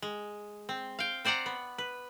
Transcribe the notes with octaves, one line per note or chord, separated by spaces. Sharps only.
G#3
C4
F5 G5
C4 C5 D5 F#5 A#5
B3
B4